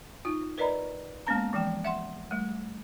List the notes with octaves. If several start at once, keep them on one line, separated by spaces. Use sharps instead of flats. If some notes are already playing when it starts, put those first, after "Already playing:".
D#4 F4
A#4 B4 D5 D#5 A#5 B5
G#3 A#3 B3 C#4 A5 A#5
E3 F3 G#3 G5
E5 F#5 C6
G3 A3